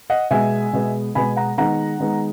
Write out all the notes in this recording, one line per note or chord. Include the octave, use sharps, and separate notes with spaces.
D#5 F#5
B2 G#3 B3 E5 G#5
B2 G#3 B3
B2 G#3 B3 G#5 B5
F#5 A#5
D#3 G#3 B3 F#5 A#5
D#3 G#3 B3